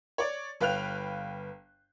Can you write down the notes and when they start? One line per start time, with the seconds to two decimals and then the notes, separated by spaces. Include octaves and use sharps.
0.18 C#5 D5
0.61 G1 B4 F5 G5 F#6 F7